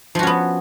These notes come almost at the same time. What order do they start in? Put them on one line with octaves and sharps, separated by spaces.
F3 F#4 C#4 B3